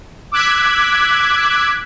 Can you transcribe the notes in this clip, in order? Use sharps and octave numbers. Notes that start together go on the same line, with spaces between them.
D6 E6 F#6 G#6 B6